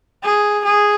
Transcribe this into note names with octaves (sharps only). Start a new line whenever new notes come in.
G#4
G#4